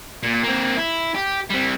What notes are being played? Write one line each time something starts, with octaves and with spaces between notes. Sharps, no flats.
A#2
A#3 C4
E4
G4
G3 C4